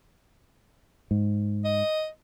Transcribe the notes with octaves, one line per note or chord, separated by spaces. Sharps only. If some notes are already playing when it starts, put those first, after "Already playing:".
G#2
D#5